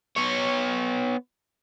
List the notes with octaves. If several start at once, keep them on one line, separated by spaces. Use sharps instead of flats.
B3 C#5